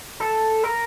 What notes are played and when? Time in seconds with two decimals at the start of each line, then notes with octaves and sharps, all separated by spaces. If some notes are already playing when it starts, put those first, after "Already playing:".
0.20 A4
0.64 A#4